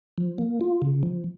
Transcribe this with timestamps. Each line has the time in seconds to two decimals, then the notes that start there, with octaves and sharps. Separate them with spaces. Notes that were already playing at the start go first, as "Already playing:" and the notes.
0.18 F3
0.38 A#3
0.61 F4
0.82 C#3
1.03 F3